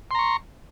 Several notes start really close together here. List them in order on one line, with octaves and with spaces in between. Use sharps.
C6 A#5 C#6